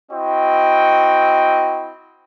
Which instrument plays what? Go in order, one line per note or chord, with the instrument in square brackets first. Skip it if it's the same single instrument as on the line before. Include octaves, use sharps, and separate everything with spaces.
[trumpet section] C4 E4 F#4 D#5 G5